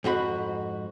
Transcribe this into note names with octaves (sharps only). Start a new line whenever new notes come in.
F2 G#2 F#4 B5